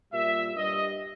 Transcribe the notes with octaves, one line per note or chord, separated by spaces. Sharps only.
A#2 G3 E5
G2 G3 D#5